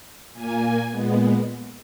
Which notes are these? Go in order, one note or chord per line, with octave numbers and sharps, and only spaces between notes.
A#2 A#3 G#5
A#2 G#3 B3